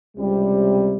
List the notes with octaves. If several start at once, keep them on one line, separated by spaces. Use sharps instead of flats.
C#2 C3 G3